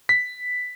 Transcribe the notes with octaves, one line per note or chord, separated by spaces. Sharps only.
B6